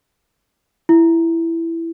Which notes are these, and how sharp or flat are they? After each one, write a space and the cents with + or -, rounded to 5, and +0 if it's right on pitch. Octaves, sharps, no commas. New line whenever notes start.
E4 +10